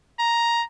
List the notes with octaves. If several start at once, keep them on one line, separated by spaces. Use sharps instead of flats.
A#5